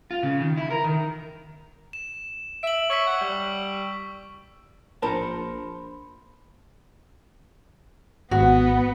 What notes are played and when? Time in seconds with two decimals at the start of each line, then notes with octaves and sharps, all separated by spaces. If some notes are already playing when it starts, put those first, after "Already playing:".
0.11 F4
0.23 C#3
0.41 D#3
0.57 E4
0.70 A#4
0.85 D#3
1.93 E7
2.63 E5 D7 F#7
2.90 C#5 C#6 E6 B6
3.07 F#5
3.21 G3
5.02 A#1 A#4 C5 A5 B5 C6 C#7
8.31 G#1 B3 F#4